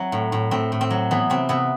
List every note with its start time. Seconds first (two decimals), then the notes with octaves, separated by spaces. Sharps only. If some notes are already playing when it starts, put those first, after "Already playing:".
Already playing: F#3 C4 E4
0.12 A2
0.32 A2
0.51 A2 C4
0.72 A2
0.81 C4
0.90 F#3
1.11 E3 B3
1.30 C3 C4
1.49 C3 B3